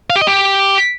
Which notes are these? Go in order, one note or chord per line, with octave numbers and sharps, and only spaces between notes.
F5
G4
D#5
G4